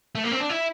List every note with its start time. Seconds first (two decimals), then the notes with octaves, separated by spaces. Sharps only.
0.15 A3
0.24 A#3
0.32 C4
0.40 D4
0.49 E4